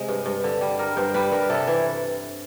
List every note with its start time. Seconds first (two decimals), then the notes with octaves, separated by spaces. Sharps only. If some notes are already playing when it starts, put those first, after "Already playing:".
Already playing: C3 G#3
0.08 G2
0.26 G2
0.44 D3
0.61 G3
0.79 G3 A#4
0.96 G2 C5
1.14 G3 B4
1.32 G2 A#4
1.49 C3 A4
1.67 E3